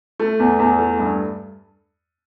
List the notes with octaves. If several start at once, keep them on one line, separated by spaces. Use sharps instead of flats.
A3
E2
E2
A3
G2